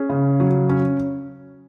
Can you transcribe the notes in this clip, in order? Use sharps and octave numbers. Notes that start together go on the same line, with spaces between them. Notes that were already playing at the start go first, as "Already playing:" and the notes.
Already playing: C#4 G#4
C#3
F#3
C#4